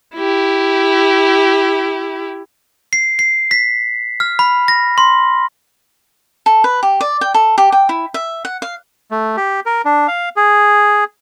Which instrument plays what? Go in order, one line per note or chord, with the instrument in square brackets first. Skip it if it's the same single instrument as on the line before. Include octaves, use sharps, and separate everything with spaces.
[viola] E4 G4
[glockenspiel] C7
C7
B6
F6
B5
A#6
C6
[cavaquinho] A4
B4
G4
D5
G5
A4
G4
G5
E4
E5
F#5
F5
[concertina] A3
G4
A#4
D4
F5
G#4